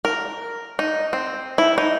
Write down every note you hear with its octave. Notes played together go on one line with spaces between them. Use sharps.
A#4
D#4
C4
E4
D#4